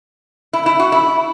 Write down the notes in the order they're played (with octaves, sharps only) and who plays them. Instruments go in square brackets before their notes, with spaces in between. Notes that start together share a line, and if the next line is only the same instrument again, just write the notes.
[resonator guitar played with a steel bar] E4
E4
F#4
E4